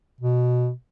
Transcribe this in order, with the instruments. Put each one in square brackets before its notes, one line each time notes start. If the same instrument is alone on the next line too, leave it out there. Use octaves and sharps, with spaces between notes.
[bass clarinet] B2